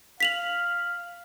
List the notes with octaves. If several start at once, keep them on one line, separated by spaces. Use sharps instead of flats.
F5 B6 F7 F#7